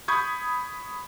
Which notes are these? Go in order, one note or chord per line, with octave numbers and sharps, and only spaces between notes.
B5 C#6 D#6 G6 G#6